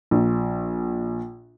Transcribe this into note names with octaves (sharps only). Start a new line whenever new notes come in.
A#1